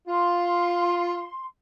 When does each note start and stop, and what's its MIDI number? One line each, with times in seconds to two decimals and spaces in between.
0.07 1.25 65
0.07 1.45 84